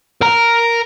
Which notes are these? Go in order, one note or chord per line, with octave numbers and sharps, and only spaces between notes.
A#4 A#5